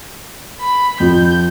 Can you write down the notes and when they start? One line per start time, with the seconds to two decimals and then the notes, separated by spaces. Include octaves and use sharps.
0.61 B5
1.00 F2 F3 G6